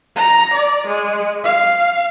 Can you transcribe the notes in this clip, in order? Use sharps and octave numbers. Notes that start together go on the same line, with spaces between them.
A#5
D5
G#3
F5